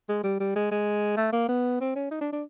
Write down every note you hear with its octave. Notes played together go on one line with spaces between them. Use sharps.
G#3
G3
G3
G#3
G#3
A3
A#3
B3
C4
C#4
D#4
D4
D4